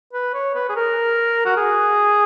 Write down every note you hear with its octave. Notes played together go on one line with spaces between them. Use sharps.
B4
C#5
B4
G#4
A#4
F#4
G#4